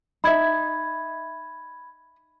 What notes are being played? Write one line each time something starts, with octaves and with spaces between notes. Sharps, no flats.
D#4 E5 B5 G#6